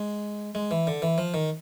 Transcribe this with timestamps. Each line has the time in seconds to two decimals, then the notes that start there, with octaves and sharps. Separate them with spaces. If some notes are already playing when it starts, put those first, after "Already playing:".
Already playing: G#3
0.55 G#3
0.71 E3
0.87 D3
1.02 E3
1.18 F3
1.34 D#3